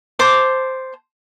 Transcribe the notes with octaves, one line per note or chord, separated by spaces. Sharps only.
C5 A5 D6